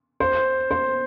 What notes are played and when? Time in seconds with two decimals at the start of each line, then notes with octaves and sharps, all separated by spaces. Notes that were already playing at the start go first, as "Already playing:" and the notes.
0.20 C5
0.71 C5